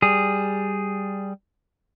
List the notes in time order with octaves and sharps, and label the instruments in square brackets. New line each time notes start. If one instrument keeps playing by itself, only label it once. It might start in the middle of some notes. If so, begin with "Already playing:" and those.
[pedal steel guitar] G3 G#4